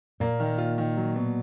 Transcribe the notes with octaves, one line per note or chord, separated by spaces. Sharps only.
A#2 A#3
D#3
F4
D#3
F#3
B2